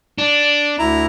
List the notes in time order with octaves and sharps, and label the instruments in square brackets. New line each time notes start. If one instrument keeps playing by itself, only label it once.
[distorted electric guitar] D4
[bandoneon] D2 E4 A#5